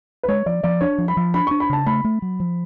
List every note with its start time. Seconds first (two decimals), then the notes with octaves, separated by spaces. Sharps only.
0.23 B4
0.28 G#3 C#5
0.46 F3 D5
0.63 F3 D5
0.81 D4 C#5
0.98 F3
1.08 B5
1.17 F3
1.34 D4 B5
1.47 D4 C#6
1.60 B5
1.70 C#3 A5
1.86 A3 B5
2.04 A3
2.22 F#3
2.40 F3